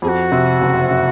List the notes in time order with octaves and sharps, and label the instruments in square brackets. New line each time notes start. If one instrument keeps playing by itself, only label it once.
[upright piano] F2 [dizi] G#4
[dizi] F#4
[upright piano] C3
F#1
C3